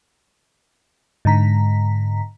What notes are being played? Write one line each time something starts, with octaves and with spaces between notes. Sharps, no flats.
G#2 D3 A#5 B6